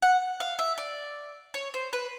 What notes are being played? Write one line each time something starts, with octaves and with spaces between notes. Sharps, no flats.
F#5
F5
E5
D5
C#5
C5
B4